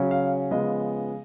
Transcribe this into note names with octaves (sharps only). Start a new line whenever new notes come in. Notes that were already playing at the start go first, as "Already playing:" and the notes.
Already playing: C#3 F#3 C#4
F5
C#3 F3 G#3 B3 D#5